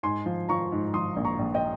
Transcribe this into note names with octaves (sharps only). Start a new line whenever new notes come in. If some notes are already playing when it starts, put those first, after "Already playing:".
G#2 G#5 C6
F3
F3 A#5 C#6
G#2
F3 C6 D#6
A#1
A#5 C#6
A#1
D#5 G5